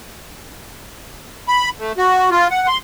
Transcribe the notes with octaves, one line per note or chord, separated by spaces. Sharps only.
B5
A3
F#4
F4
F#5
C6